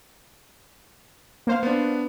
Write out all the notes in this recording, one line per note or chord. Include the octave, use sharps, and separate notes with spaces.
A#3 C5 F5
B3 D4